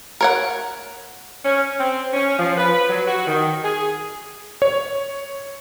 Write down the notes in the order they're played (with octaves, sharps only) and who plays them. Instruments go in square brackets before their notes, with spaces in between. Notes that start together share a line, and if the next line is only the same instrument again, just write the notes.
[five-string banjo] A#4 C#5 F#5
[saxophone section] C#4
C4
C#4
F3
B4
F#3
F#4
D#3
G#4
[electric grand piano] C#5